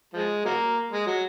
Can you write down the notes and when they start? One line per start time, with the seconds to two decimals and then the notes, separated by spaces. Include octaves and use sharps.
0.14 F3 G#3
0.45 F#3 A#3
0.92 G#3
1.07 F#3